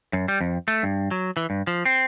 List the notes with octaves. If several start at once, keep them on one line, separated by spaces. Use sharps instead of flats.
F#2
G3
F2
A3
G2
F#3
E3
G2
F3
C4